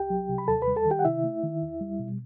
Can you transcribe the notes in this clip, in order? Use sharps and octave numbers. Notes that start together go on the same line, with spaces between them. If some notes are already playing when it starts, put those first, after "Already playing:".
Already playing: C2 G4 G5
F#3
C3
B5
D#2 A4 A5
B4 B5
G3
A4 A5
D#3
G4 G5
F#5
C3 E4 E5
A3
D#3
E2
G3
B2